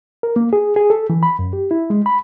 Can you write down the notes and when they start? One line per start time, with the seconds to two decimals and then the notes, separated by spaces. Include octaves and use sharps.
0.23 A#4
0.36 A#3
0.53 G#4
0.76 G#4
0.90 A4
1.10 E3
1.23 B5
1.39 F#2
1.53 G4
1.71 E4
1.90 G#3
2.06 B5